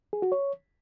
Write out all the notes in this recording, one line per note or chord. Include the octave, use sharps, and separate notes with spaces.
G#4
F#4
C#5